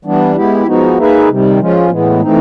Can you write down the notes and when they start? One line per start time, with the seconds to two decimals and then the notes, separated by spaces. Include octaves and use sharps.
0.05 E3 G3 B3 D4
0.36 G#3 B3 E4 G4
0.67 F3 G#3 B3 D#4 F#4
0.97 A#3 D#4 G#4 B4 E5
1.28 C3 D#3 G3
1.59 F3 G#3 C#4 F4
1.91 A2 E3 G#3 B3
2.22 E3 A3 C4 D#4